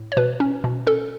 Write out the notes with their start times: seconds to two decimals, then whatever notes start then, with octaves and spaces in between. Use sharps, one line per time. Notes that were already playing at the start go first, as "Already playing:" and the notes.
Already playing: A2
0.12 C#5
0.17 B2 B4
0.40 C#4
0.64 B2
0.87 C#4 A4